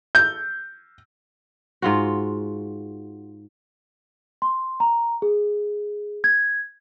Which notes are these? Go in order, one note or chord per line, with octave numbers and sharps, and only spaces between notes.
G6
G#2 F4 F#4
C6
A#5
G#4
G#6